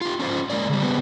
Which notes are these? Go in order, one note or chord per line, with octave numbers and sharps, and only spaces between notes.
F4 G4
C#4 F4 C5
G#3 A#3 D5
C#3 G3
C#3 B3 C4 G4